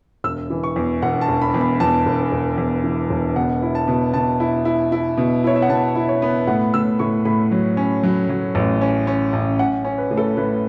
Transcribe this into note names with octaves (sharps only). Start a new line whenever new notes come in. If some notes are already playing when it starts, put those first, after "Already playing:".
E1 E6
E3
C#6
E2
E1 F#5
A5
E1
B5
E2
B5
E2 A5
E1
E1
E2
E3
E1
B2 F#5
E4
A5
B2
B2 A5
E4
E4
E4
B2
E4 C#5
E5
F#5
B2 A5
E4
C#5
B3
A2 F#5
A2 E6
A2 C#6
A2 B5
F#3
C#4
F#3
F#3
A1
C#4
C#4
A1
C#4 F#5
C#4
B4
A2
A4
A2 B4